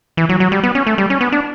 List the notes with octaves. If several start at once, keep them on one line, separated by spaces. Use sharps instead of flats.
E3
F#3
F#3
G3
B3
C#4
A3
G3
C#4
B3
D4